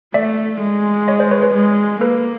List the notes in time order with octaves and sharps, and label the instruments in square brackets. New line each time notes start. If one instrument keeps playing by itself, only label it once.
[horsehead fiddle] A3 [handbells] D5 E5
[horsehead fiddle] G#3
[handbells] C#5 D#5
C5 D5
B4 C#5
B4 C#5
[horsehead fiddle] G#3
[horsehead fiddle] A#3 [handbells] A4 B4